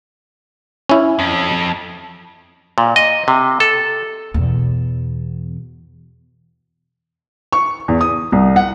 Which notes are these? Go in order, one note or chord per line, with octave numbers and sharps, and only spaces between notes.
C#4 E4
F2
A#2
D#5
C3
A4
E2 B2
C#6
E2
D#6
C2
F#5